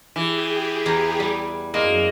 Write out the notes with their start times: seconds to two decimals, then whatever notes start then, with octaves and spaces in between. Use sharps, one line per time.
0.16 E3 G4 G#4
0.86 E2 A#5
1.20 G3
1.74 F#2 G#3 A#3